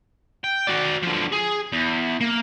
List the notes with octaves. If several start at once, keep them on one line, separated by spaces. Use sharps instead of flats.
G5
F#4 D5
D3 F3
G#4
E2
A#3